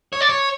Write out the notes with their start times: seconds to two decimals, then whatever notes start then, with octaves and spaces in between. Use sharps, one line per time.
0.13 C#5
0.21 D5
0.29 C#5